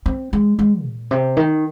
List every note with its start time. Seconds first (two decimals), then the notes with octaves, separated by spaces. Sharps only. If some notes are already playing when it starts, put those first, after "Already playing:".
0.06 C4
0.33 G#3
0.59 G#3
0.84 A#2
1.11 C3
1.37 D#3